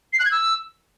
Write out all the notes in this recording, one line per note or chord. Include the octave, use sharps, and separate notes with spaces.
C7
F#6
G#6
E6